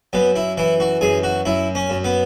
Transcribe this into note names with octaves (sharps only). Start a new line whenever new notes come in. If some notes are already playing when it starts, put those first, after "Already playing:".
F#2 B3
E4
E3 E4
F#4
F#2 G#4
F#4
F#2 E4
C#4
F#2
B3